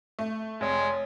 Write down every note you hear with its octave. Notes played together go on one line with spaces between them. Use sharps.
A3
F1 G#3 C#5